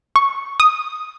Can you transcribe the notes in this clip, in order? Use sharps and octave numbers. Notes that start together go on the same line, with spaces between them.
C#6
D#6